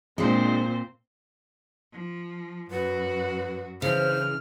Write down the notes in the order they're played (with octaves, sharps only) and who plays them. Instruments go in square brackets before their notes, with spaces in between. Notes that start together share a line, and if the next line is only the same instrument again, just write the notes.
[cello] A#2 [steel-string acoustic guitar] G#3 D4 [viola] C4 C5
[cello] F3
[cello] F#2 F#4 [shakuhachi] B4
[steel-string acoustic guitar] C#3 [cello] E3 [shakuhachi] C5 [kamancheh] F6